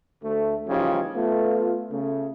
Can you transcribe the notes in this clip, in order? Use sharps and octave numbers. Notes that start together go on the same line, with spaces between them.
D2 A3
C#3 E3 F3 G3 D#4 G4
A3 B3 F4
C#3 A3